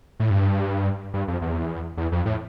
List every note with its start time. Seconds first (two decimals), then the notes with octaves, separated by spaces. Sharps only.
0.20 A2
0.30 G2
1.14 G2
1.28 F2
1.41 E2
1.97 E2
2.12 F2
2.26 A2